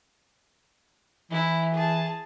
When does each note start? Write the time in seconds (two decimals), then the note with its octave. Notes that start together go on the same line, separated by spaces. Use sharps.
1.31 E3 E4
1.74 G#4 A5